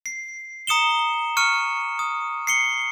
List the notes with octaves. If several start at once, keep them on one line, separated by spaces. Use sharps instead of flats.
C7
A#5 D#6 C#7 E7 G7
C#6 F6 C#7 D#7
D#6
C7 C#7 G7